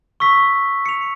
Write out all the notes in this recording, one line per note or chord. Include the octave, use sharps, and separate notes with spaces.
C#6 E6 B6
C#7 F7